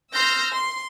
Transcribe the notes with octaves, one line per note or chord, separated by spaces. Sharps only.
C6 E6 F6 G6 A#6
C6